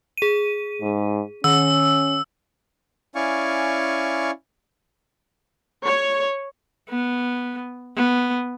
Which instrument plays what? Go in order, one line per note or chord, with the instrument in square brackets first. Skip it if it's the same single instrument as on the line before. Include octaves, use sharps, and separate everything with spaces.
[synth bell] G#4 D#7
[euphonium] G#2
[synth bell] D#3 [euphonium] C#4 [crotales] E6
[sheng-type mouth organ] C#4 E4 D5 F5 G#5 C#6
[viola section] C#5
[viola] B3
B3